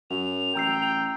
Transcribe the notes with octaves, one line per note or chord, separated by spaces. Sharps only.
F#2 F7
A1 G5 A#5 E6 C7